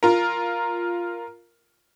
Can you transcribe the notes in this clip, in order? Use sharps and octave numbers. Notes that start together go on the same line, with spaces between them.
F4 A#4